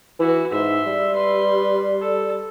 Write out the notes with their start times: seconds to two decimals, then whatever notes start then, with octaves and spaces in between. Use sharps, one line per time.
0.19 E3 E4 F#4
0.52 G#2 E5 C6
0.87 G3
1.15 B4 C6
2.01 A4